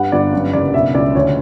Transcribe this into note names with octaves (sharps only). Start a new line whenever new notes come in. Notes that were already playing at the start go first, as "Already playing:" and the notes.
Already playing: G2 F#5
G1 D5
F#2
F#1 D5
B2 E5
C#2 D5
D2 C#5